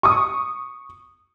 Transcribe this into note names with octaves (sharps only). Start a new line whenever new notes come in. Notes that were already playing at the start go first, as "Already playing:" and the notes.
C#6 D#6